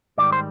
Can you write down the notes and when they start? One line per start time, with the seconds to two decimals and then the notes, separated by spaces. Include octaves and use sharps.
0.18 G#2 D#3 G3 D5
0.32 C5